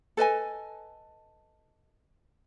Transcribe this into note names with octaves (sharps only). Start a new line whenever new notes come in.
A4 B4 D#5 G#5